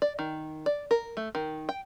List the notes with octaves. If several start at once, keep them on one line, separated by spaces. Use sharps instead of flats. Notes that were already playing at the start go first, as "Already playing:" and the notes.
D5
D#3
D5
A#4
A3
D#3
G5